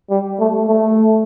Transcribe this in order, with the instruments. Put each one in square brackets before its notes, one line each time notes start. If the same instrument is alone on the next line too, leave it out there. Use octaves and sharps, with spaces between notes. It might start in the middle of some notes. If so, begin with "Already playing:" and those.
[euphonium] G3
A3
A3